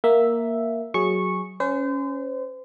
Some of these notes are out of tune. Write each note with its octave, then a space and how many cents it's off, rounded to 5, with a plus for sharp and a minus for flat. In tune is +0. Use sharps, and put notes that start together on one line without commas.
A#3 +0 E5 +0
F#3 +0 G#4 +0 C#6 -10
C#4 +0 C5 -35